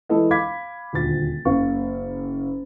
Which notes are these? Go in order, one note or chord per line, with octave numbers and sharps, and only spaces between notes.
E3 G#3 E4 A4 D#5
F5 B5 D6 G#6 B6
D#1 D2 A6
F#1 A#3 F5 C#6